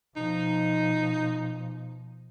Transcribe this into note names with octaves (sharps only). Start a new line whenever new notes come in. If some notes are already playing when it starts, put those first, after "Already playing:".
B2 F3 D#4